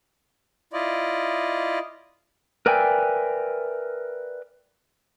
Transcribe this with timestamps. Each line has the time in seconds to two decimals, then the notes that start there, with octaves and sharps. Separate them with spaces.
0.73 E4 F4 D5 D#5
2.66 A#4 B4 D5 E5 G5 G#5